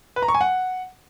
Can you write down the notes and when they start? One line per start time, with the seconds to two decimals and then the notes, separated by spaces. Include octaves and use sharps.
0.16 B4
0.22 A#5
0.28 C#6
0.35 G#5
0.41 F#5